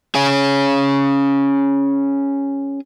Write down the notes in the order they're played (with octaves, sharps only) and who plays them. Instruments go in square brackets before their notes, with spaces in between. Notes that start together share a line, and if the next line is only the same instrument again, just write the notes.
[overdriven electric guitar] C#4 G#4